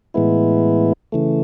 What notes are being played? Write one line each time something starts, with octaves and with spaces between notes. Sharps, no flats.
A2 E3 G#3 B3 E4
C#3 E3 A3